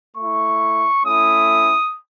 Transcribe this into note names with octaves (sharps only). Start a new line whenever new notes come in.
A3 E4 C#6
A3 C#4 E4 D#6